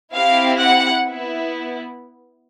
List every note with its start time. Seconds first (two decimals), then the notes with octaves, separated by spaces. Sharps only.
0.14 C4 E4 G4 F5
0.60 F#5
1.05 B3 E4